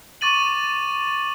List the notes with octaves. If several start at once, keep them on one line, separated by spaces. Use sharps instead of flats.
C#6 D6 A6 D#7 F#7